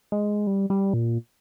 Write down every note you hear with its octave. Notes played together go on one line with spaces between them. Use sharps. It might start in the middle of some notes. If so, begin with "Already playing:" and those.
G#3
G3
G3
A#2